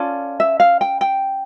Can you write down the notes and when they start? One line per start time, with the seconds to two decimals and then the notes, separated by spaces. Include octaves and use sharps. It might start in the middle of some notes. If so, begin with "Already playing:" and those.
Already playing: C#4 F4 A4 D5
0.40 E5
0.60 F5
0.81 G5
1.01 G5